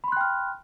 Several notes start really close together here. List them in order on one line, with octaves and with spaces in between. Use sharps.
B5 C6 F#6 G5 F6